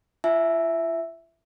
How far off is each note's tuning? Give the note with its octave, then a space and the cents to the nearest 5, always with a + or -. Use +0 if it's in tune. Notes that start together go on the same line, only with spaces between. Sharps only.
F4 -45 E5 +0 G#5 +35